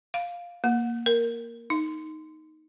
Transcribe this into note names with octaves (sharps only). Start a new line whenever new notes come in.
F5
A#3
A#4
D#4